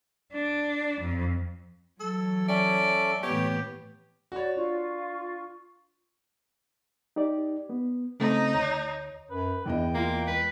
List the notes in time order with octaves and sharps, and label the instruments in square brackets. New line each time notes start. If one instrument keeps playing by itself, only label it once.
[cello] D4
F2
[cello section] E3 F#3 [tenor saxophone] A4
[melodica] C#4 A4 E5 [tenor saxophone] D5
[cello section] A2 E3 B3 [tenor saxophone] G4 [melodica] C#5
[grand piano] F#4 C#5 [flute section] D5
[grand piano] D4 [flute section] F4 C#6
[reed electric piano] D#4 G4 D5
B3
[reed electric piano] C#3 A3 C4 [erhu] D#4
[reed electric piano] D2 C#5
[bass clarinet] F#2 [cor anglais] B4
[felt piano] E2 E3 D#5 [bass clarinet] G2 [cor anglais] G5
[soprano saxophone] A#3 [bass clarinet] F4
[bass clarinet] C#2 [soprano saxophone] B4